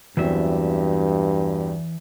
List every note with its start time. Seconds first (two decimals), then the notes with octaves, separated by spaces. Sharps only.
0.17 E2 G2 E3 F#3 C4 E5